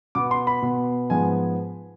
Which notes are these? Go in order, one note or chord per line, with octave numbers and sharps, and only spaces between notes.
B2 B3 D6
C6
B5
B2 B3
G#2 F3 G#3 B3 G#5